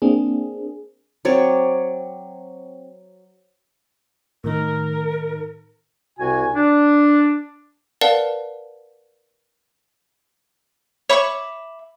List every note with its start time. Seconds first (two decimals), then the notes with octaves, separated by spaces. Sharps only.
0.02 A#3 C4 D4 G#4
1.25 F#3 C4 C#5 D5
4.44 A2 D#3 D#4 A#4
6.19 C2 C3 F#4 G#5
6.54 D4
8.01 A#4 B4 D5 F5 F#5 A5
11.09 C#5 E5 B5 C#6 D6